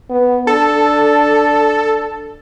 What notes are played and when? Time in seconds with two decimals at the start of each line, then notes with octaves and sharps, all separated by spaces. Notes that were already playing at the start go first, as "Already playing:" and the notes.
0.10 B3
0.47 D4 A4